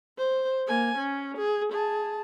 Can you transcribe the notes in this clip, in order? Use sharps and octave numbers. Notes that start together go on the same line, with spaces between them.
C5
A#3 G#5
C#4
G#4
G#4 A5